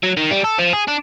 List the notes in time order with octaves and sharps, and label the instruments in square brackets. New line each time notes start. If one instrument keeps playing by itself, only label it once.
[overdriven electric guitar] F#3
D#3
G3
A4
F3
G#4
D4